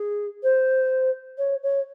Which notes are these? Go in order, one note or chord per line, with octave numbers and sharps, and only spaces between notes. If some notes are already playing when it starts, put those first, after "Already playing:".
Already playing: G#4
C5
C#5
C#5